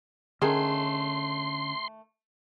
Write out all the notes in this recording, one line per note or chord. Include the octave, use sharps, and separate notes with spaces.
D3 D#3 A3 C4 C#4 G#4 C6